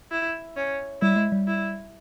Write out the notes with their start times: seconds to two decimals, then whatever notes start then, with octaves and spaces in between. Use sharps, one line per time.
0.11 E4
0.56 C#4
1.02 G3 E4
1.16 G#3
1.32 G3
1.47 E4